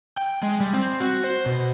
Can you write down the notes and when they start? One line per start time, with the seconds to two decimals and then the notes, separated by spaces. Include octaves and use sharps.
0.17 G5
0.43 G#3
0.60 G3
0.73 C4
1.00 F#4
1.24 C5
1.46 B2